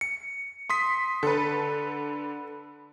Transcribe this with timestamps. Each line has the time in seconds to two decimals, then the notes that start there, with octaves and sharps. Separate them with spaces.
0.01 C#7
0.70 C6 D#6 B6
1.23 D3 A4 B4